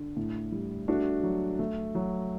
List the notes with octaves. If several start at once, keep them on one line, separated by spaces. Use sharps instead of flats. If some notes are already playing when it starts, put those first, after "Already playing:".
Already playing: D3
A2
G3
A3 D4 F#4
F#3
A3
F#3